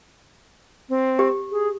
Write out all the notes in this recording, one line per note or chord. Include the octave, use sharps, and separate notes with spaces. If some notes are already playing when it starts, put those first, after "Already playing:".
C4
G4
G#4